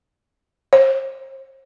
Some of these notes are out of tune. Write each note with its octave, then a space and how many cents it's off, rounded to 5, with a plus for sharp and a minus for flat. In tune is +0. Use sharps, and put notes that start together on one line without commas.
C5 +35